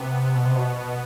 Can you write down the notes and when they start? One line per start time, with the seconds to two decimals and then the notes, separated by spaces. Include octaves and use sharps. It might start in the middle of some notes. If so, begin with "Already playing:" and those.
Already playing: C3 B3
0.35 B2
0.45 C3
0.56 B2